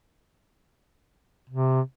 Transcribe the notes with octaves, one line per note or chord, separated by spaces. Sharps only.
C3